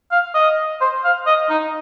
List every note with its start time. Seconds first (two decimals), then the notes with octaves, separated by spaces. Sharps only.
0.12 F5
0.34 D#5
0.81 C5
1.04 F5
1.27 D#5
1.50 D#4